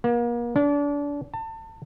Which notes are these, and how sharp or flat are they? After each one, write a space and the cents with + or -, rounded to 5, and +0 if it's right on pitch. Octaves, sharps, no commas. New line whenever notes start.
A#3 +35
D4 -30
A5 +30